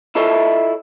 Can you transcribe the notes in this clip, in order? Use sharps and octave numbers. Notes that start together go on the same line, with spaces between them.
E4 F4 A4 C#5 D#5 E5